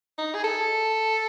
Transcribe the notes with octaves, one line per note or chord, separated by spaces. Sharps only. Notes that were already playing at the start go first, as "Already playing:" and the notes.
D#4
G#4
A4